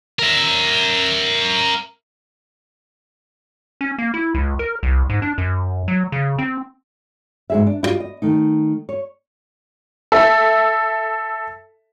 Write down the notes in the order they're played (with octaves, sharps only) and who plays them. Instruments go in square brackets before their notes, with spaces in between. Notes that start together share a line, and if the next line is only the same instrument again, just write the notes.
[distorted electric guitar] A#4 E5
[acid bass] C#4
A#3
E4
C#2
A#4
C2
G#2
D4
F#2
F#3
C#3
C4
[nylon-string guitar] G#2 G#4 E5
D4
E4 F4 G4 D#5
D#5
D#3 A3 D#4
C#5
[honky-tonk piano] A4 E5